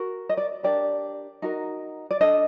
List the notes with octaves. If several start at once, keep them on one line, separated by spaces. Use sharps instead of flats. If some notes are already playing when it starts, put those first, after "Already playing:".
Already playing: F#4 A#4
D#5
D5
D4 G4 A#4 D5
D#4 F#4 A#4
D5
D4 A4 D#5